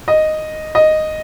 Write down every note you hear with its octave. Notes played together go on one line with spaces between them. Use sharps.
D#5
D#5